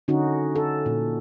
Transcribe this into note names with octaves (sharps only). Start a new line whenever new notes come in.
D3 C#4 D#4 F#4
A4
A#2